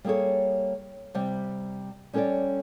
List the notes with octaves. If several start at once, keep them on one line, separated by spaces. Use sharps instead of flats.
G3 A#3 G#4 A4 C#5
C3 G3
G3 C#4 A4 B4 C#5 D5